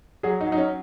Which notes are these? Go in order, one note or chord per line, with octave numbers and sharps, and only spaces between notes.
F#3 G#4
D#4
F#3
D#4
C#4